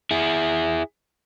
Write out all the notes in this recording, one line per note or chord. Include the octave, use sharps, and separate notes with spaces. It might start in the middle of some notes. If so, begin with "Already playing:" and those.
E4 G#4